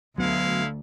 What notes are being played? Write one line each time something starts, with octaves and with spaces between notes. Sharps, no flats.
D2 F#3 G#3 B3 E4 F5